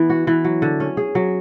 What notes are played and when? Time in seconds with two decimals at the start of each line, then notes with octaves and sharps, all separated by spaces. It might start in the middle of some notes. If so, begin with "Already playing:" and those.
Already playing: E3 B3
0.10 F#4
0.27 E3
0.45 F#3
0.62 D3
0.80 C#4
0.97 G#4
1.15 F#3